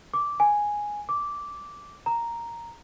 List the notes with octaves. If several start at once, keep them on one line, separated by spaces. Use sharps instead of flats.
D6
G#5
D6
A#5